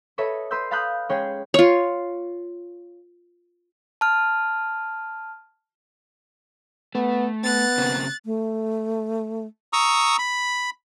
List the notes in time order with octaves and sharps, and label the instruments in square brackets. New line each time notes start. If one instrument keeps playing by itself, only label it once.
[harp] A4 B4 C#5 D#5 E5 B5
B4 C6 E6 G6
F5 A5 B5 D#6 F#6 G6
G#3 C#4 G#4 C#5 G5
[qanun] F4 C#5
[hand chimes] A5 F6
[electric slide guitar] A3 [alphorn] B3
[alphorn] B3 [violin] F#6 A6
[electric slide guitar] C#3 A#3 C4
[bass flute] A3
[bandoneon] A#5 C#6 D#6 E6
B5